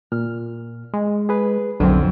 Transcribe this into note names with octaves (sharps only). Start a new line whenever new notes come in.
A#2 F6
G#3
G#4 B4
B1 F2 D3 F#3 C4